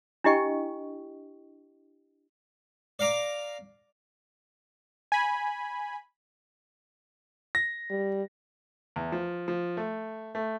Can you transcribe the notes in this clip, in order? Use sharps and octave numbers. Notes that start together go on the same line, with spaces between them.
D4 E4 G4 D#5 G5 C#6
D5 F5 A#5 D6
G#5 B5
A#6
G3
E2
F3
F3
A3
A3